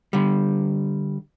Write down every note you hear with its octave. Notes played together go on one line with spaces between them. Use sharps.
D3 G3